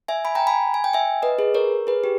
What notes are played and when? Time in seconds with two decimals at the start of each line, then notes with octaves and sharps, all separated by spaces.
0.08 E5 G#5
0.25 G#5 B5
0.35 G5 A#5
0.47 G#5 B5
0.74 G#5
0.84 G5
0.93 E5 G#5
1.22 B4 D#5
1.39 G#4 B4
1.54 A#4 C#5
1.87 G#4 B4
2.04 G4